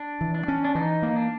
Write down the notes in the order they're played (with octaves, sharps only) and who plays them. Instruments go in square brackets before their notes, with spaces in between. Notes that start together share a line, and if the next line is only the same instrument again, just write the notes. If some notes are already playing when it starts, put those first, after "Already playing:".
Already playing: [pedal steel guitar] D4
[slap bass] E3
[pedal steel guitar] D4
[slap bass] C#4
[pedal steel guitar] D4
[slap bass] E3 [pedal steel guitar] D#4
[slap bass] A#3
[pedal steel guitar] D4